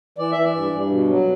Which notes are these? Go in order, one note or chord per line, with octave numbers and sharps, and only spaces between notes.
E3 D5
E3 E5
D5
G2
G2
B2
F#3